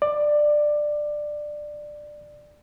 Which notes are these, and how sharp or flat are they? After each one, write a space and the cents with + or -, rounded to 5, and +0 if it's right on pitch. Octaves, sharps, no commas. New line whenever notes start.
D5 +15